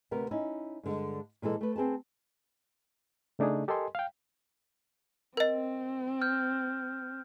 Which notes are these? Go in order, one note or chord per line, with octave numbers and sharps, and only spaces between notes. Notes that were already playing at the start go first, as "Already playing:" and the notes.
D2 C3 B3 A#4
C#4 D#4 E4
G2 D3 G#3
A#2 E3 G#3 A4
A3 B4
C4 G#4 B4 A5
C#3 A3 D4 D#4 G#4
G4 A4 A#4 D#5 G#5 C6
F5 G5
C4 A#4 D#5
F6 G6